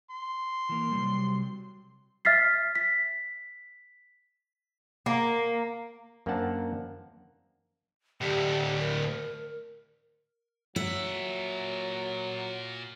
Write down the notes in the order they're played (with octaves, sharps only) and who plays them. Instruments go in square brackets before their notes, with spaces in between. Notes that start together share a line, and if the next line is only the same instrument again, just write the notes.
[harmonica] C6
[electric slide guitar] E3 A#3
C3 F#3 G3
[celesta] E5 F6 A6 B6 C7
B6
[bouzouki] A#3
[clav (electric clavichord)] F#2 A#3 C4 D4 F#5 A5
[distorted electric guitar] D2 A2 [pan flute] G4
[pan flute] A#4
[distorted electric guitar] A#2 F#5 [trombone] F#3 [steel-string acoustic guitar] E5